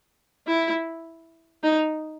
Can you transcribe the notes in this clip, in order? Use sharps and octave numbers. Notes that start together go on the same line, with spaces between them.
E4
D#4